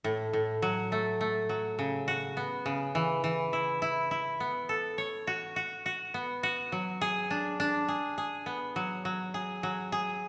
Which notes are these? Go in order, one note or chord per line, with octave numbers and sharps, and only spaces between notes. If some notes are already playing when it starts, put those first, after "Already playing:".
A2
A2
F#3
A3
A3
F#3
C#3
F#4
B3
C#3
E3
E3
E4
E4
E4
B3
A4
C#5
F#4
F#4
F#4
B3
F#4
F#3
G#4
D4
D4
G#4
G#4
B3
F#3
F#3
G#4
F#3
G#4